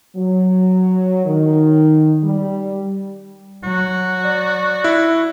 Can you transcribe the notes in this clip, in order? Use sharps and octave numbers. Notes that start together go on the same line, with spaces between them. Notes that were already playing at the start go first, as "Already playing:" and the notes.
F#3
D#3
G3
F#3 F#4
D5
E4